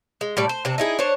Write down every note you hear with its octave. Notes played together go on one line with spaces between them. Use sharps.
G#3
A2 G3 D5
C5
C3 C4 D4
D#4 E4 G#4
D4 C5 C#5